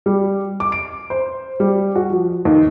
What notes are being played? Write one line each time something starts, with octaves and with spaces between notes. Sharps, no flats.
G3
D6
D7
C5
G3
F#4
F3
D#2